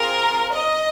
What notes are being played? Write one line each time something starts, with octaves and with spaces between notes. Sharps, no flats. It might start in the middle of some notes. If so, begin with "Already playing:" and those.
Already playing: C4 F4 G#4 A#4
D#5